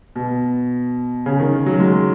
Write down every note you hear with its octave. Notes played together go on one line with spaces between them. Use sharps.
B2
C#3
D#3
F#3
G#3